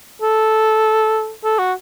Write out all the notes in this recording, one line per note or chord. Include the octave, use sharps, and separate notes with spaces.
A4
A4
F#4